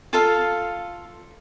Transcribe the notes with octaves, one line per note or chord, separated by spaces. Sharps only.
F4 A4 F5